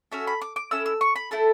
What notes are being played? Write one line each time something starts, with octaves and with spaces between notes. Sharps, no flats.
C#4 F#4 A4 E5
B5
D6
D6
C#4 E4 A4 E6
E6
C#6
B5
A3 E4 A4 A5